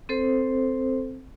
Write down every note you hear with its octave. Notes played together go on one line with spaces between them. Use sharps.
C4 A4 C5